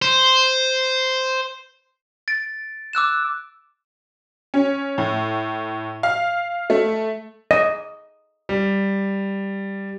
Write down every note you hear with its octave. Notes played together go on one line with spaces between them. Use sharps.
C5
A6 D7
D6 E6 F#6 E7
C#4
A2
F5
A3
D#5
G3